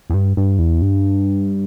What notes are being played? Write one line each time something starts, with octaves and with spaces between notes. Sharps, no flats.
E2
G2
G2
E2
G2